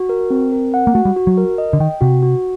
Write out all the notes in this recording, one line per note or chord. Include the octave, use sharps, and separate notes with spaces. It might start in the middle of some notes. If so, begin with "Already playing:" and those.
Already playing: F#4
A#4
C4
A#4
F#5
A#3
A3 F#4
G3
F#4
F#3
A#4
D#5
D3
D#3 G5
C3 F#4
F#4